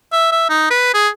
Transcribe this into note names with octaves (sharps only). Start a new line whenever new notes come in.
E5
E5
D#4
B4
G#4